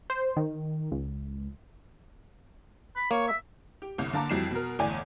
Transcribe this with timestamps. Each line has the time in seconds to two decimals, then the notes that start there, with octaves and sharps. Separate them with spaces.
0.10 C5
0.36 D#3
0.92 C#2
2.96 B5
3.11 A#3 C#5
3.28 E5
3.82 G4
3.98 G1 C2
4.14 D3 A#3 A5 A#5 D6
4.29 F2 E3 G3 F#4 C7 E7
4.51 B2 A#4
4.79 G1 E2 A2 D5 G#5